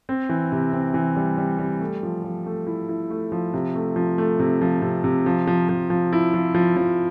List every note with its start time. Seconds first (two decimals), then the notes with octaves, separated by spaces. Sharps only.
0.09 C4
0.29 E3
0.52 C3
0.73 C4
0.94 E3
1.16 G3
1.38 G3
1.59 G3
1.81 A3
2.03 F3
2.24 F3
2.46 A3
2.67 E4
2.89 E4
3.11 A3
3.32 F3
3.54 C3
3.75 A3
3.96 F3
4.18 A3
4.40 C3
4.61 F3
4.82 C3
5.04 C3
5.26 F3
5.47 F3
5.69 F3
5.90 F3
6.13 E4
6.34 F3
6.54 F3
6.76 F3